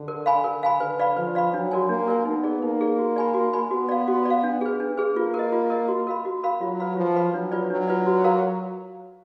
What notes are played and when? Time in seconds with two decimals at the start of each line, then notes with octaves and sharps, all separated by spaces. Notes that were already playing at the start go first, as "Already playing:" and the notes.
Already playing: D3
0.08 A#4
0.26 F5 G#5 B5
0.44 A#4
0.63 F5 G#5 B5
0.80 D3 B4
1.00 D5 F5 B5
1.17 F3 B4
1.35 D5 F5 B5
1.53 F#3 D4
1.71 F#4 A#4 D5 G#5
1.89 A#3 D4
2.08 F#4 A#4 D5 G#5
2.25 B3 D#4
2.44 G#4 D5
2.62 A#3 D#4
2.81 G#4 D5
2.99 F#4
3.16 D5 G#5 B5
3.34 F#4
3.53 D5 G#5 B5
3.71 B3 F#4
3.89 D5 F5
4.08 F#4
4.25 D5 F5
4.43 D4
4.61 G#4 B4
4.80 D4
4.97 G#4 B4
5.16 A#3 F4
5.34 A#4
5.39 D#5
5.52 F4
5.70 A#4 D#5
5.88 F#4
6.07 A#4 F5 B5
6.25 F#4
6.44 A#4 F5 B5
6.61 F#3 F4
6.80 B4 F5 B5
6.97 F3 F4
7.16 B4 F5 B5
7.33 F#3 D4
7.52 F4 B4 D5
7.70 F#3 D4
7.88 F4 B4 D5
8.06 F#4
8.24 A#4 F5 A#5